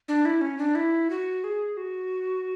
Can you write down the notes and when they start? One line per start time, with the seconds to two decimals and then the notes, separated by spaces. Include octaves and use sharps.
0.08 D4
0.25 E4
0.41 C#4
0.58 D4
0.75 E4
1.10 F#4
1.44 G#4
1.77 F#4